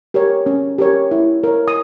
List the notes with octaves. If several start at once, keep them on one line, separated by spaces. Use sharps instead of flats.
G4 A#4 C#5
C#4
G4 A#4 C#5
E4
A#4 C#5
D#6